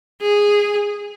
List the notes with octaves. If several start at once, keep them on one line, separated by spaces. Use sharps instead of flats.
G#4